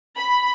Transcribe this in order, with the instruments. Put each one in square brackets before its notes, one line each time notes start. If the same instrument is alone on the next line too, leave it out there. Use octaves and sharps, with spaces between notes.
[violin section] B5